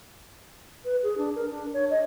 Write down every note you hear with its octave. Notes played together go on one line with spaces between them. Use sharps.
B4
G#4
D4
A#4
D4
C#5
D#5